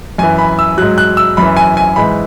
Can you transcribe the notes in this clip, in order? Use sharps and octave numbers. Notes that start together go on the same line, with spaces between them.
F#2 E3 G#5
B5
E6
G#2 F#3 F#6
F#6
E6
F#2 E3 B5
G#5
G#5
G#2 E3 B5